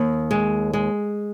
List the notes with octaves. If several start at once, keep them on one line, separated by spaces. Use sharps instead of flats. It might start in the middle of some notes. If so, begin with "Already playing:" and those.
Already playing: D#2
G#3
G#3